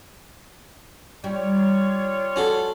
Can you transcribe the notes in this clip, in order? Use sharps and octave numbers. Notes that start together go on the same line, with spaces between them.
G3 F4 G4 C#5
C#4 F#4 A4